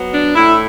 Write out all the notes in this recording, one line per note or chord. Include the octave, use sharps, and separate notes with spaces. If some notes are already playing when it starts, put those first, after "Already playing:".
Already playing: F#3 B3
D4
A2 E4